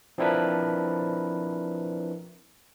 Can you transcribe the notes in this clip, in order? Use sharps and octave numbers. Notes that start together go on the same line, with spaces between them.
F3 C4 D4 E4 A#4 B4